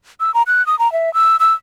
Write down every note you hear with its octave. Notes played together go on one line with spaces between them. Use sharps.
E6
A#5
F#6
D#6
A#5
E5
E6
E6